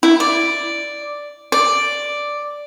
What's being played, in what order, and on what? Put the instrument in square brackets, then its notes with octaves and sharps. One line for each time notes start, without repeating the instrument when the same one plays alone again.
[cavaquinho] E4
D5
D5